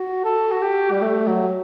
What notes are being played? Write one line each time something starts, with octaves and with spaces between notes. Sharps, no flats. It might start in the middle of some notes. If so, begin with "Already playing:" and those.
Already playing: F#4
A4
F#4
G4
G3
A3
F#3